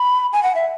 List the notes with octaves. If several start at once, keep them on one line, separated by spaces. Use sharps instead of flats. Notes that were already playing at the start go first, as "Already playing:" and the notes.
Already playing: B5
G#5
F#5
E5